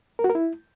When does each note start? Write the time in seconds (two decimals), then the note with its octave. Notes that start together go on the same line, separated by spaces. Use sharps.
0.19 A#4
0.24 F#4
0.30 A#4
0.35 E4